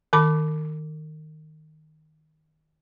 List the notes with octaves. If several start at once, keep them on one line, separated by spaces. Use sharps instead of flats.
D#3 B5 D6